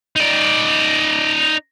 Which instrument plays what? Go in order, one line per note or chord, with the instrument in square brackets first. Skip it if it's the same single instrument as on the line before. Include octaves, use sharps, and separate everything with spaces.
[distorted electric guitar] D#4 D5